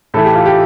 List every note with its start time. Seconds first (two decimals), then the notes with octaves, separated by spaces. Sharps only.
0.14 A2 E3 A3 A4
0.25 G4
0.35 F4
0.46 G4